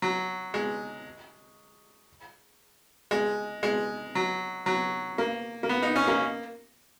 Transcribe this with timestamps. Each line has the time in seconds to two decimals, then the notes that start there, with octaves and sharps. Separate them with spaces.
0.02 F#3
0.54 G#3
3.11 G#3
3.63 G#3
4.15 F#3
4.66 F#3
5.18 A#3
5.63 A#3
5.69 B3
5.83 D#4
5.96 C#4
6.08 A#3